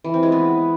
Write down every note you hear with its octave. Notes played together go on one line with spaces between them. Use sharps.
E3
C4
G#3
B3